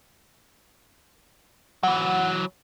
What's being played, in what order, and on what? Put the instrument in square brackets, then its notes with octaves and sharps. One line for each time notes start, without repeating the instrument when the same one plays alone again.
[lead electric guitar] E3 F#3 [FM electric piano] F#5